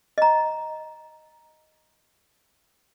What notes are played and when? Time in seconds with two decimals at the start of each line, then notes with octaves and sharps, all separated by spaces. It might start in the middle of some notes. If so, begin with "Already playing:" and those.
0.18 D#5 A#5